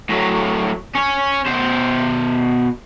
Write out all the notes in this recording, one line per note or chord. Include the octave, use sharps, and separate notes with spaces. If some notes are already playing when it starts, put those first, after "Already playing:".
A2 F#3
C#4 C#5
B2 C5